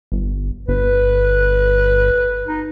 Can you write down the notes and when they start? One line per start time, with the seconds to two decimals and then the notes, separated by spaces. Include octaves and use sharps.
0.12 G1
0.68 G1 B4
2.47 D#4